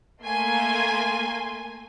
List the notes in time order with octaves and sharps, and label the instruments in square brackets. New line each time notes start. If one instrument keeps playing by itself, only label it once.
[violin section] A3 A#3 G#5 C6